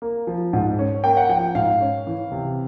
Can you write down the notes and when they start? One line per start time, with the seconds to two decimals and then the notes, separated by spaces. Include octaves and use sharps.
0.02 A#3
0.27 F3
0.53 G#2
0.79 C#4
1.04 A#3 G5
1.17 F#5
1.29 F3 G5
1.55 G#2 F5
1.81 C#4
2.07 E3
2.32 C3